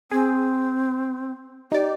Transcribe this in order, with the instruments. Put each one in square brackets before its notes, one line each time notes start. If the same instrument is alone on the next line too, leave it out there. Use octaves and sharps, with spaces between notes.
[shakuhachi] C4 [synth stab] G#4
[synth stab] D#4 D5 [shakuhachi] G4